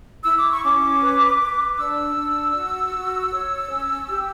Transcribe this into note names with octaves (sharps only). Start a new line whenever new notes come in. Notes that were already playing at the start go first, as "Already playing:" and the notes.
E4 E6
D6
C#6
C#4 D6
B4
B4
D4 E6
D4
F#4
F#4
C#5
C#4
G4